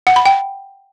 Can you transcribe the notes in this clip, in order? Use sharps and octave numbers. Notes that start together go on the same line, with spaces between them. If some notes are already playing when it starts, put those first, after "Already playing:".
F#5
B5
G5